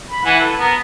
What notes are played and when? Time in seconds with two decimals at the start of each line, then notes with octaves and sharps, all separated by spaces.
0.10 B5
0.25 E3 F#5 G#5
0.40 A4 B4
0.59 B3 A#4